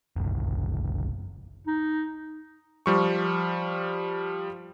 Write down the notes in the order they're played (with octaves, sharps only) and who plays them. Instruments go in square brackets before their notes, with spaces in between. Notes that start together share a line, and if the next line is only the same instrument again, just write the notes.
[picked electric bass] F#1 C2
[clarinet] D#4
[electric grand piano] F3 G3 C#6